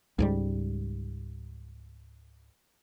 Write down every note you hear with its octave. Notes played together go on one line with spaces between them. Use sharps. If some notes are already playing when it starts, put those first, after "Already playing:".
C#2 G#2 G3